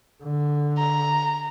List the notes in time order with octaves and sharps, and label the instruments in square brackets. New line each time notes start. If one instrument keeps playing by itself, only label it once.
[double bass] D3
[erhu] A#5